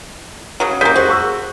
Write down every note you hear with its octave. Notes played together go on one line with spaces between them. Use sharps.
C#3 F#3
C#3 A#3 G6 B6
F#4 G#4 C5
C#6 E6